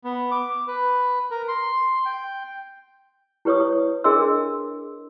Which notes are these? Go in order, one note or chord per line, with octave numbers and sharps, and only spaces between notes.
B3
D6
B4
A#4
C6
G5
E4 G4 B4 C#5 C#6 D#6
D4 G#4 A#4 D#5 C6 E6